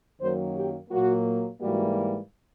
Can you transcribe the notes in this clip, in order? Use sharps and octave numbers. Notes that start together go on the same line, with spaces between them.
F#2 D#3 F#3 A#3 C5
G4
A#2 F#3 A#3 F#4
G#2 E3 G3 A#3 F#4